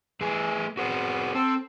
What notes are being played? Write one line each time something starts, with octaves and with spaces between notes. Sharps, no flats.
E3 A3 G#4
B3 F#4 G#4 C5
C4 A4